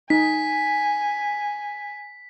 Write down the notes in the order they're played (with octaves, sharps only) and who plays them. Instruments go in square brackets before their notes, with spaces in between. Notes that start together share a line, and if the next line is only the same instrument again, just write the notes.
[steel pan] D#4 [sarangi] G#5 [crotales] B6